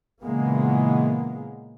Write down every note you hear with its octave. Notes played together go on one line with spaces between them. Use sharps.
A#2 C#3 E3 G#3 A#3 B3